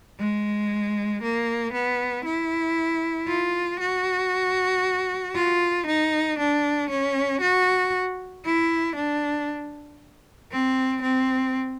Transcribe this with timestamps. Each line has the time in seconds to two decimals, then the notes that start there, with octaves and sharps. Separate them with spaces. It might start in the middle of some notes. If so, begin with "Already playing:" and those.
0.19 G#3
1.23 A#3
1.73 B3
2.25 E4
3.28 F4
3.80 F#4
5.35 F4
5.87 D#4
6.39 D4
6.90 C#4
7.41 F#4
8.45 E4
8.96 D4
10.52 C4
11.02 C4